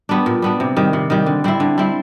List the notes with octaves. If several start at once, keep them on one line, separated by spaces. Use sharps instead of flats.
G3 B3 D4
A#2
G3 B3 D4
C3
D#3 G3
C3
D#3 G3
D3
G3 C4 E4
D3
G3 C4 E4